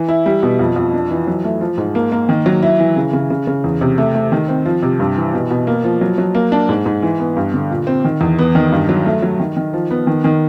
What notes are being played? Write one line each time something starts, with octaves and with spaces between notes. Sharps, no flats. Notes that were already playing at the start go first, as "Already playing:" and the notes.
Already playing: E3
E4
G3
B2
F2
F2
D4
E3
F#3
A3
F3
G#2
A#3
A#3
D#3
F#3
E4
E3
C#3
C#3
C#3
C#3
E2
C3
A3
A3
D#3
C4
F3
C3
G2
E3
B2
B2
A#3
F3
F#3
F#3
A#3
D4
G#2
G#2
E3
B3
G2
D3
A#2
C4
D#3
E2
B3
D#3
G2
F#3
A3
F#3
D#3
D#3
F3
B3
D#3
D#3